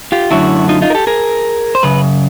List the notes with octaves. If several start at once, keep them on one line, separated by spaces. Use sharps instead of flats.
F4 G4
F#2 D3 F#3 A3 E4 F#4
D#4 F4
D#4 F4
A#4
G4 A4
G#4 A#4
C5
F#2 C#3 B4